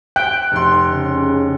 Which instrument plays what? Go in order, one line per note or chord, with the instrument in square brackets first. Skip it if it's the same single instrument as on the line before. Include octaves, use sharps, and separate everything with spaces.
[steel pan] G5 [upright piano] F#6
[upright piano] F1 C6
[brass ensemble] C#3